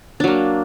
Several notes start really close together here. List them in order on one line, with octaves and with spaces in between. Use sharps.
D4 F#3 A#3